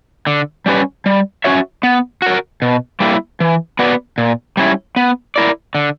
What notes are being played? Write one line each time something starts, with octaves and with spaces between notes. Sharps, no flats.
D3
G3 C#4 G4 B4
G3
C#4 F#4 C#5 E5
B3
F#4 A#4
B2
G3 A#3 E4
E3
B3 F#4 B4 D5
A#2
G3 C#4 E4
B3
E4 A#4 D5
D3